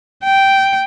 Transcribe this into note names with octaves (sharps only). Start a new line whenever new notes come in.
G5